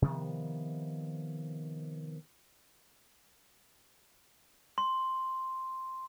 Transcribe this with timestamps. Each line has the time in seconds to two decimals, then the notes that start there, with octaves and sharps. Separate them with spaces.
0.02 C3 D#3 F3 B3
4.78 C6